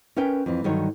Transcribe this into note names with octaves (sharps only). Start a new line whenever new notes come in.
C#4 A#4 B4 E5 G5 G#5
F2 E3
G2 D3 D#3 F#3 C#5